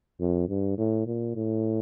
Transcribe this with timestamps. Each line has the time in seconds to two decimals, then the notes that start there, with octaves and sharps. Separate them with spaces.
0.20 F2
0.49 G2
0.78 A2
1.06 A#2
1.36 A2